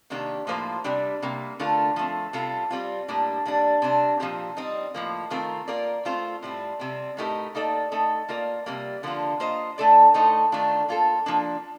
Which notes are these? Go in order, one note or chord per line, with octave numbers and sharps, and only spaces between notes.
C3 D#3 A#3 D4 G4
A2 F3 A#3 F4 C5
C3 G3 D4 G4 D5
C3 G3 A#3
D3 A3 D4 F4 A#4
F3 A3 C4
C3 G3 C4 F4 A4
G3 C4 F4
A2 G3 A#3 D4
A#2 G3 D4
C3 G3 D4
A#2 F3 C4 G4
G3 C4 D#4
A2 F3 A#3
D#3 A3 C4 F4 A#4
A#3 F4 A#4 D5
A3 C4 F4 C5
A2 G3 C4
C3 G3 C4
A2 A3 D#4 G4 A#4
A#3 D#4 A4 D5
A3 D#4 A4
A#3 F4 A#4 D5
C3 G3 A#3
D3 F3 A#3 D4 F4
A#3 F4 C5 D#5
A3 D4 A4 D5
A2 A3 D#4 A4 C5
D#3 A3 D4 F4
A#3 F4 A4
F3 A#3 D4